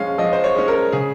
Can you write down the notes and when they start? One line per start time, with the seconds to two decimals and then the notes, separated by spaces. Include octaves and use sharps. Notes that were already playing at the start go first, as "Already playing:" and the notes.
Already playing: F3 G#3 C#4 F5
0.18 F3 D#5
0.33 C5
0.44 C#5
0.55 G#3 C#4
0.68 A#4
0.92 C#3 G#4